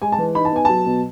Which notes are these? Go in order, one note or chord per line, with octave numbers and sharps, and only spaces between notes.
G#3 G#5
A5
E3
D#4 B5
A5
B3 G#5
F#3 A5
B2